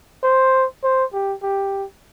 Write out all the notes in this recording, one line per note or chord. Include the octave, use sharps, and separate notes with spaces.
C5
C5
G4
G4